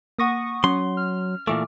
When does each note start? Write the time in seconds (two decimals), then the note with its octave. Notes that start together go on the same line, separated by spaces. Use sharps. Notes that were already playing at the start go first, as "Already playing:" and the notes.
0.19 A#3 F#5 C#6 D#6 A#6 D#7
0.64 F#3 C#4 C6
0.97 F6
1.47 A#2 E3 A3 D6